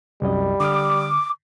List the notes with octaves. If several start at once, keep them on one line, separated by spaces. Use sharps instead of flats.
C2 F#2 G3 D#5
D3 D6 D#6 F6